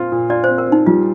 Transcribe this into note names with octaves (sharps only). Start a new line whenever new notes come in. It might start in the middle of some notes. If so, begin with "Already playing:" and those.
Already playing: A#2 C4 F4
A#2
F4 D5
C4 C5
A#4
C4
D#4
G3 F4